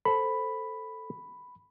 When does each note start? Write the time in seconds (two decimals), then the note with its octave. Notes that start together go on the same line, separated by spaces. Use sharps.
0.05 A4 C5 B5